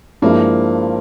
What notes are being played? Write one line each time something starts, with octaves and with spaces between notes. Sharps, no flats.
G2 F3 G#3 A#3 E4